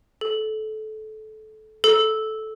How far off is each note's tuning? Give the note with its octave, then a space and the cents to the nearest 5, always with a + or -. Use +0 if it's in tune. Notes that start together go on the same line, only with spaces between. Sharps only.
A4 -20
A4 -10